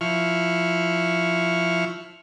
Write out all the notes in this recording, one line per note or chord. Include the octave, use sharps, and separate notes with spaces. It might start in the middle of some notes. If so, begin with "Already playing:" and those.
F3 E4 C#6 F6